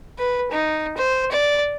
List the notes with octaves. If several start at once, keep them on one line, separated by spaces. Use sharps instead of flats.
B4
D#4
C5
D5